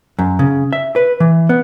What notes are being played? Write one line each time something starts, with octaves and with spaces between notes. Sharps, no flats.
F#2
C#3
E5
B4
E3
B3